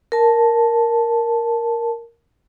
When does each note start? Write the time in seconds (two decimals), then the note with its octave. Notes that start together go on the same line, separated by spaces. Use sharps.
0.12 A#4 A5